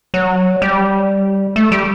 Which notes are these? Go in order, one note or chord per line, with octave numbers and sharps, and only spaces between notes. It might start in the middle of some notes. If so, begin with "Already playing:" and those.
F#3
G3
A3
G3